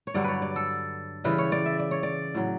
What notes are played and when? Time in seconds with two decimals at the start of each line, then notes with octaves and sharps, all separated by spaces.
0.07 C#5
0.14 G2 D3 F#3 D5
0.24 B4 C#5
0.42 D5
0.56 A4
1.24 C#3 E3 G3 B4
1.38 C#5
1.52 D5
1.66 E5
1.80 D5
1.91 C#5
2.03 D5
2.35 A2 F#3